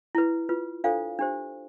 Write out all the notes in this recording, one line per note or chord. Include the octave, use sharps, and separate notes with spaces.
E4 B4
F4 B4
D4 F4 A4 C5 F5
D4 G4 C5